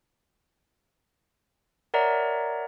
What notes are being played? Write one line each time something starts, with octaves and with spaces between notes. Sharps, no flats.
A#4 C#5 D5 E5 F#5 A#5